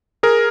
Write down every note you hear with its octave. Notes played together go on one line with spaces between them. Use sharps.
G#4 A#4